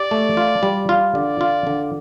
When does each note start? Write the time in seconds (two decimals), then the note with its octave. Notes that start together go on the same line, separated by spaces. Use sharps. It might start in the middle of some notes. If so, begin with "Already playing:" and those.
Already playing: G4 D5
0.11 A3
0.37 F4
0.63 G3
0.89 F4
1.15 D3 D5
1.41 F4
1.67 D3